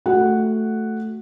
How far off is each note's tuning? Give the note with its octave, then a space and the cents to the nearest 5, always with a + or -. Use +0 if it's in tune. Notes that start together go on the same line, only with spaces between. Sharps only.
A3 +0 F#4 +0 F#5 +0